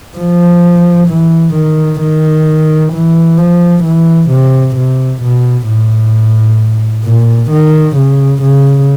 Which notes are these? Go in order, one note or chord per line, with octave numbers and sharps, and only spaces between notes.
F3
E3
D#3
D#3
E3
F3
E3
C3
C3
B2
A2
A#2
D#3
C#3
C#3